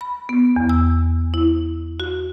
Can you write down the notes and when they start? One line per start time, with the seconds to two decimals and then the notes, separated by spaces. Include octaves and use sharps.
0.01 B5
0.29 B3
0.56 E2
0.69 E6
1.34 E4
2.00 F#4